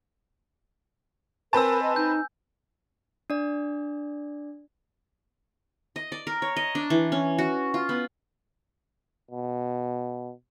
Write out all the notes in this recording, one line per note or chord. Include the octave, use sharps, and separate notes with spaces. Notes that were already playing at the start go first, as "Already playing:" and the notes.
C4 A#4 B4 G#5 A5 E6
D#5
D#4 G6
D4 D5
D#5
D5
A#4
C#5
D#5
D4
E3
C#4
F#4
F4
B3
B2